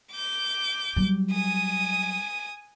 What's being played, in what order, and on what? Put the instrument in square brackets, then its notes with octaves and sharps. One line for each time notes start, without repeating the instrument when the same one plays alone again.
[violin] D6 G6
[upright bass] F#3 G3
[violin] G#5 D#6